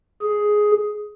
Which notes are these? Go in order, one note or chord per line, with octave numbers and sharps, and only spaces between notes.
G#4